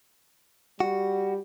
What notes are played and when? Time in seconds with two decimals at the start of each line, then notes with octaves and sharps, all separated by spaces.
0.80 G3 F#4